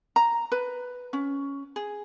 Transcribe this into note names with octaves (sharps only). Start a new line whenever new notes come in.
A#5
B4
C#4
G#4